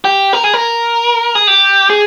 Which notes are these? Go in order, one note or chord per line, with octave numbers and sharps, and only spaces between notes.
G4
A#4
G#4
A#4
G#4
G4
G#4